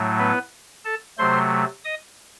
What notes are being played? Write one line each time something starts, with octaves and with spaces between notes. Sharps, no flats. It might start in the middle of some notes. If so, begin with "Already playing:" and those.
Already playing: A2 F#3 A3
B3 B4
A4 A5
C3 F#3 A3 C5 C6
D#5 D#6